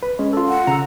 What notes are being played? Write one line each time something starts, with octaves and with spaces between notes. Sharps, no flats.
B4
G#3 C#4
F4 A4
F#5
C#3 A#5 E6